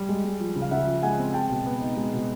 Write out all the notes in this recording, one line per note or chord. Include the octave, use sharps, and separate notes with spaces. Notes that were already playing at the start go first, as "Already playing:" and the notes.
Already playing: G3
G#3
G#3
F3
C#3
F5
C#3 E5 F#5
F3
G#3 F#5 G#5
C4
G#3 G5 A5
B2
B3
D#4
G#3
B2